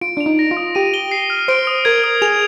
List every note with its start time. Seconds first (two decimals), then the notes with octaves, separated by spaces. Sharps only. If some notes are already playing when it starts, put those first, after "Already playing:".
0.01 F4 D7
0.17 D4 F7
0.26 D#4
0.39 A#6
0.51 F4
0.57 D#6
0.75 G4 D#7
0.94 G7
1.11 C7
1.30 F6
1.48 C5 D7
1.67 D#6
1.85 A#4 G#6
2.04 D#6
2.22 G#4 F7